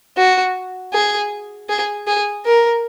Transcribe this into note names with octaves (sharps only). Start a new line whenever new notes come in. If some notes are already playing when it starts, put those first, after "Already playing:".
F#4
G#4
G#4
G#4
A#4